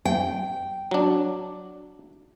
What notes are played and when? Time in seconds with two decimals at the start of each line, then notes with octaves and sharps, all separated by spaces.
0.05 G5
0.91 F#3 D4